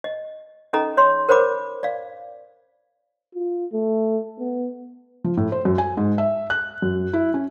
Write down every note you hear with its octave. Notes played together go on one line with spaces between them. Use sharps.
D#5
C#4 D#4 A4 D#5 A#5
C#5 C6
A#4 C5 C#5 F#5 B5 D6
D5 F5
F4
A3
B3
F3
A2
C5
F#2
G#5
G#2
E5
F#6
F#2
E4
C#4